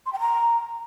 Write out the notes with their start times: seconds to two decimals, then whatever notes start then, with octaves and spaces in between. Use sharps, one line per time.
0.06 C6
0.13 G5
0.20 A#5